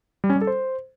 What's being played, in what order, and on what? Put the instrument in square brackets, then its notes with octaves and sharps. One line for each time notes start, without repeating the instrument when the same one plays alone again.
[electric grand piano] G3
C#4
G3
A4
C5